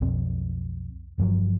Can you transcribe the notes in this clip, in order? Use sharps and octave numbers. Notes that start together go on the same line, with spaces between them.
B1 F2 C4
G1 G2 F3 F#3